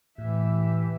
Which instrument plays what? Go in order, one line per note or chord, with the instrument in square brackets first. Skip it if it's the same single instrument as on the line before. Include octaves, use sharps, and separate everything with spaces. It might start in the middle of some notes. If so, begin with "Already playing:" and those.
[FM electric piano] A2 [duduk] E3 [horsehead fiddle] G4 E5